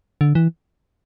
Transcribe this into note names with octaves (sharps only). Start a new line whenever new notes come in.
D3
E3